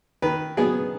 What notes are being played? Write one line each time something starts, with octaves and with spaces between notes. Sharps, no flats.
D#3 B4
F#3 B3 G#4